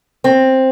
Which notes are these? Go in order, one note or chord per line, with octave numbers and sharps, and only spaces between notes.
C4